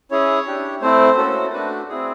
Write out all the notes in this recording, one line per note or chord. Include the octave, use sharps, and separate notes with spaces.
C#4 E4 G#4 C#5
D4 G4
A3 C4 E4 C5
A#3 C#4 F#4 A4
A3 D4 F#4 B4
C4 E4 G#4